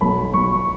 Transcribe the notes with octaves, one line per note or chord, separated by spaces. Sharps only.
B1 B5
B1 C#6